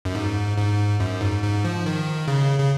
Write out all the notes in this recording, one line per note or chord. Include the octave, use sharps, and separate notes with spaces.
F#2
G#2
G#2
F#2
G#2
G#2
F3
D#3
C#3
C#3